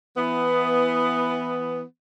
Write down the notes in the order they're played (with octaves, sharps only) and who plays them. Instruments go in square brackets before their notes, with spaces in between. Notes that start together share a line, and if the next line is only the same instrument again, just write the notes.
[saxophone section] E3 B3